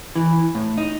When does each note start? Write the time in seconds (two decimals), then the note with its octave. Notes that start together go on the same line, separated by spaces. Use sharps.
0.15 E3
0.55 A2
0.78 D#4